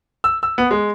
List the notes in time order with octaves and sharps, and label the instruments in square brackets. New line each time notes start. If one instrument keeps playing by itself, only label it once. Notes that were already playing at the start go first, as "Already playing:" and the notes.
[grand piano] E6
E6
B3
G#3